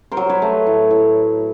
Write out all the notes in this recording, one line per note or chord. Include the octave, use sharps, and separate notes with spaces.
A#4 C5
F#3
B4 C#5
A3
A2
A2